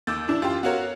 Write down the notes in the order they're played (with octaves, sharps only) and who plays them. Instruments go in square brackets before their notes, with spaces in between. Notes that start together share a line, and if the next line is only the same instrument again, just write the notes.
[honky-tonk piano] D#2 G6 [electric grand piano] D6 E6 A6
[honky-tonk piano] E3 D4 E4
[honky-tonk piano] F#2 G4 G5 [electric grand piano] F4 C6
[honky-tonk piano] B3 F#4 A#4 [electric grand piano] C#5 F5 F#5